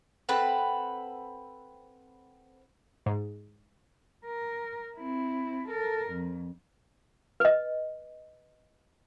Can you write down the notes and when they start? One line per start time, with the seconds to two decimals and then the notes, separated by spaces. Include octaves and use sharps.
0.29 C4 A4 B4 F#5
3.06 G#2
4.26 A#4
4.98 C4 E4
5.68 A4 A#4
6.10 F2
7.40 B4 D#5